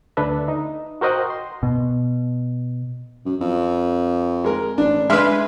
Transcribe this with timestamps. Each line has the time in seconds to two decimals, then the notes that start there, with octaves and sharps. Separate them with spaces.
0.17 D2 D4 A4 B4 E5
0.48 D#4
1.01 F#4 A#4 C5 D#5 F#5 G5
1.30 C6
1.63 B2
3.25 F#2
3.41 F2
4.44 G#3 A#4
4.78 A1 D4
5.10 G#3 D4 B4 E5 C6 F6